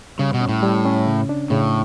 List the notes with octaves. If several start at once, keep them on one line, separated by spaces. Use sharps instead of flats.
C#3 G3
B2
C#4
A2
G3
C#4
C#3
D4
A2 C#3